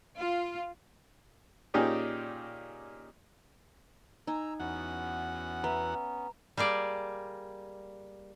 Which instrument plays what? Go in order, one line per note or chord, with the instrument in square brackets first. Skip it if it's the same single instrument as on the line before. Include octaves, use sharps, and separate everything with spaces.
[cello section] F4
[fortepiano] A#2 C#4 D#4 G4 G#4 D5
[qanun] D#4 G#5 [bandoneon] A#5 E6
[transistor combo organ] E2 F#4 F#5 [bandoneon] B3 C#4
[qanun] B4 E5 [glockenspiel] A#5
[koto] G3 A#3 G#4 D5